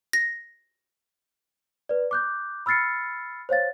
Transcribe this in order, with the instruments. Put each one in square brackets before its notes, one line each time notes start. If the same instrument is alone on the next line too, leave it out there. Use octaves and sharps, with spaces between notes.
[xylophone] A#6
[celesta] B4 D5
D6 F#6 G6
B5 E6 F6 A6 C7 C#7
C5 C#5 F5 A6